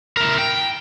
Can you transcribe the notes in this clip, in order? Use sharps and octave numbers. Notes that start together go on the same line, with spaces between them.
E4 A#4
G5